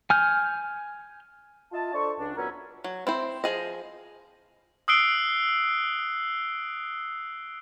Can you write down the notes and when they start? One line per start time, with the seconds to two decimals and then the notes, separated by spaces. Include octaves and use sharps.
0.10 G#5 F6 G6
1.73 F4 D#5 E5 A5
1.94 D4 A4 C5 C#6
2.19 C#2 D4
2.36 A#2 F#3 B3 C#4 E4 A#5
2.84 F#3
3.07 C4 E4 C5
3.44 F3 G#4 D#5
4.88 D#6 E6 F#6 C7 D7 G7